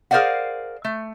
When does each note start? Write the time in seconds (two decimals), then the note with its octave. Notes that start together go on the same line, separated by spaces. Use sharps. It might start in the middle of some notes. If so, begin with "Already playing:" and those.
0.11 G#4 A#4 C5 D5 F5 F#5
0.85 A3